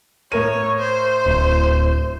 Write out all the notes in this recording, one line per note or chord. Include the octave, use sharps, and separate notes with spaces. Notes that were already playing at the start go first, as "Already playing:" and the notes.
A2 A#4 C#5 D#7
C5
D1